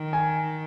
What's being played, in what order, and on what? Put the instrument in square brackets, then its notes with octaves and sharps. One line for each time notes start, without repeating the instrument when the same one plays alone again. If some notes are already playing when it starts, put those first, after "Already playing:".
Already playing: [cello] D#3
[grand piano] G#5